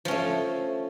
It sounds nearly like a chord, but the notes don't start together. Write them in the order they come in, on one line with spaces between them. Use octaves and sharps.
F3 C#4 A3